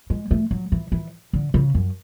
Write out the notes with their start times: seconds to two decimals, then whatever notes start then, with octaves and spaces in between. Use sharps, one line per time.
0.10 G#3
0.31 A3
0.51 F#3
0.72 E3
0.92 E3
1.33 D3
1.54 C#3
1.75 F#2